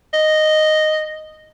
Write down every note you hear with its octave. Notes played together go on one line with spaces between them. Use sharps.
D#5